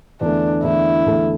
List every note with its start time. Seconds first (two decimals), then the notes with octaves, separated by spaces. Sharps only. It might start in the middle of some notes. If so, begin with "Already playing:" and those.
0.21 E2 D3 A3 D4
0.63 E2 D3 A3 E4
1.06 E2 D3 A3